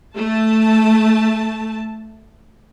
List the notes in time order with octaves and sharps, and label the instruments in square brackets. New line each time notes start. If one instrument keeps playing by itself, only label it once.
[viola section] A3 A5